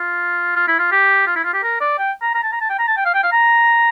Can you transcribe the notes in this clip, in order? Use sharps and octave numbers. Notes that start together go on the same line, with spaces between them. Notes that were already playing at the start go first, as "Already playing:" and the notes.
Already playing: F4
F4
E4
F4
G4
F4
E4
F4
G4
A#4
D5
G5
A#5
A#5
A5
A#5
A5
G5
A#5
A5
G5
F5
G5
F5
A#5